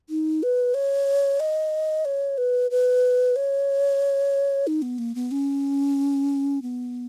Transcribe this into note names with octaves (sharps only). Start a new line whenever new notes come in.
D#4
B4
C#5
D#5
C#5
B4
B4
C#5
D#4
B3
A#3
B3
C#4
B3